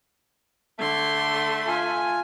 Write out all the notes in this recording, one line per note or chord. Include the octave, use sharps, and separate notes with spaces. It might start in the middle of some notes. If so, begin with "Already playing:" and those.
D3 A3 C6
F4 G#5